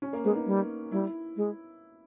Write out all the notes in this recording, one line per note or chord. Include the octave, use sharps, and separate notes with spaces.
C#4
A#3
G#3 B3
D#4
G3
G3 E4
G#3